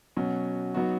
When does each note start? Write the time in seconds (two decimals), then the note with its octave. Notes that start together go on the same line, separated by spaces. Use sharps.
0.17 B2 F#3 C#4
0.74 F#3 B3 D#4 F#4